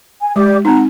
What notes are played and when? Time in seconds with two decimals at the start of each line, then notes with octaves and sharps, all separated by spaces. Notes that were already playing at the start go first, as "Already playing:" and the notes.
0.20 G#5
0.36 G#3 G4 D5 D6
0.65 C4 D#4 F#5 A#5